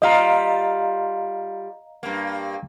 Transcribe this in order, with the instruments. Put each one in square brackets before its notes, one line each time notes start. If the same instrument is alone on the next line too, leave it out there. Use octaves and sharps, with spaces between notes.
[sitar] G3 F4 [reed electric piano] D#5 F5 A#5
[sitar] G2 A#3